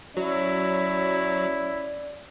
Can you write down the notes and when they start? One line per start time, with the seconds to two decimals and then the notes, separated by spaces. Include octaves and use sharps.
0.17 F#3 C#4 E4 D5